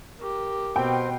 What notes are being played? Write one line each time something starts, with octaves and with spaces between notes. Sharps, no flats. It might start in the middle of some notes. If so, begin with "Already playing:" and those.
G4 A#4
B2 C4 G5